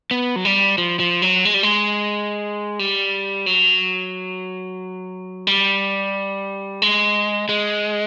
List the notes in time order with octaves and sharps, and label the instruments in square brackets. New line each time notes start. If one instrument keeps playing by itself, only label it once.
[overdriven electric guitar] B3
F#3
G3
F3
F3
F#3
G#3
G3
G#3
G3
F#3
G3
G#3
G#3